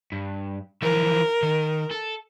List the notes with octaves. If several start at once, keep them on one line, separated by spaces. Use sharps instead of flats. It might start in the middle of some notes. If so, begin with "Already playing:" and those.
G2
E3 F3 A#4
D#3
A4